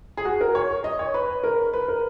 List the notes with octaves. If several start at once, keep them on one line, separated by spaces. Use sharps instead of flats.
G#4
F#4
A#4
C#5
D#5
C#5
B4
A#4
B4
A#4